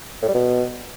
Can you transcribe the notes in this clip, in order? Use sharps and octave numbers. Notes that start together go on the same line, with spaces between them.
A2
G3
B2